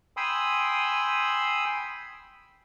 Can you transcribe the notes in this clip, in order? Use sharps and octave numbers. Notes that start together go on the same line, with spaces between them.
G5 G#5 B5 C6 D#6 E6